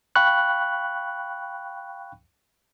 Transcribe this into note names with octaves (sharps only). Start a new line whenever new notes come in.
F5 G5 B5 C#6 F#6